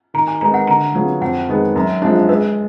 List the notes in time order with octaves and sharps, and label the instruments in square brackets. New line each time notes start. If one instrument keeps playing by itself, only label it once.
[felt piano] D#3 [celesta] A#5
[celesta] G#5
[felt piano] G#3 B3 D#4 A#4 [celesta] A#5
[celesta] F#5
[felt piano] D3 [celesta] A#5
[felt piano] F#3 B3 F4 G#4
[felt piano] F2 [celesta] F#5
[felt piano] D#3 G#3 B3
F#2
F3 G#3 D4
[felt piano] G#3 [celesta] B4